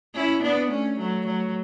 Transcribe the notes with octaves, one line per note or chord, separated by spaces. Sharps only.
C#4 E4
B3 D4
A3 C#4
F#3 A3
F#3 A3